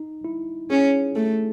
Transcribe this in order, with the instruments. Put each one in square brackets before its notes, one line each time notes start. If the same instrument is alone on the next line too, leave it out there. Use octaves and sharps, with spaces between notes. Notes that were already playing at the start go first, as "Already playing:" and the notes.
Already playing: [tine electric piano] D#4
E4
[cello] C#4 [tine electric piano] G#4
[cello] A3 [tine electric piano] A4